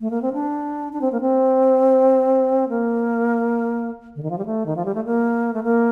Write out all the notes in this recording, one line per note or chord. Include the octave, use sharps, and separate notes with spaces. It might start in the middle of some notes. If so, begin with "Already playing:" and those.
A3
A#3
C4
D4
D4
C4
A#3
C4
A#3
D3
D#3
F3
G3
A3
D#3
F3
G3
A3
A#3
A3
A#3